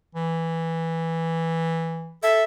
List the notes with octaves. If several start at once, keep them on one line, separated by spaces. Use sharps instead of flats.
E3
A4 E5